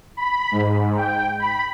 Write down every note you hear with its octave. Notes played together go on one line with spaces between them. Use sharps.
B5
G#2
G5
B5